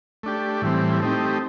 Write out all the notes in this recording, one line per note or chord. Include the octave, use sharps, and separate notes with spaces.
A3 D4 G4
A2 E3 G3 C4
A3 C4 D#4 G4